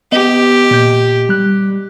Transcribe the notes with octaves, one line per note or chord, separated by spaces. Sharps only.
B3 G4 D#5
A#2 G6
G3 F#6